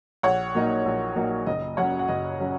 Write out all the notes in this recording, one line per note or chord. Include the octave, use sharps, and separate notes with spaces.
A#1 C#5 F#5
A#2 F#3 A#3 D#4
A#1
A#2 F#3 A#3 D#4
F#1 D#5
F#2 F#3 C#4 C#5 F#5
F#5
F#1 D#5
F#3 C#4